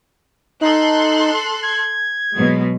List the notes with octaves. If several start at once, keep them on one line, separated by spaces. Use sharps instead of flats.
D#4 A4 C6 F#6
G#6
B2 F#3 G#3